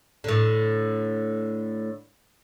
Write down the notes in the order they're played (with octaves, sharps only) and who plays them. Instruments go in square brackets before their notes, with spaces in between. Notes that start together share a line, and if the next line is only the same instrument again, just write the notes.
[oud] A2 D3